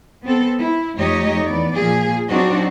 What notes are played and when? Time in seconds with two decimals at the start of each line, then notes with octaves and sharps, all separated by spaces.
0.23 B3 C4 A4
0.58 E4
0.97 F2 A3 D#4 G4 C#5 D#5
1.45 E2 B3 D5
1.75 A#2 F3 G#4
2.29 F#3 C4 D4 D#4 F#4